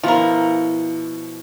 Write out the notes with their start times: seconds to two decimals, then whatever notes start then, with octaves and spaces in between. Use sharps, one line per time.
0.03 B2 F3 E4 F4 A#4